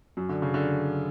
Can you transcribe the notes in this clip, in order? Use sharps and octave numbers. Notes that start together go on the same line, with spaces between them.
F#2 F#3
D3
C#3
D3